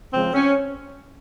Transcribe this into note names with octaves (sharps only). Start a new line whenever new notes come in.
C#3 F3 G#3 C4
C#4